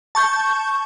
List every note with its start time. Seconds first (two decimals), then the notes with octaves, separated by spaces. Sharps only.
0.15 A5 C#6 G6